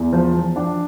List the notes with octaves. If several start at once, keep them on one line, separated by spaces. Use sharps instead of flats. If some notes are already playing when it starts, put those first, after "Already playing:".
Already playing: E2
F3
F3
D4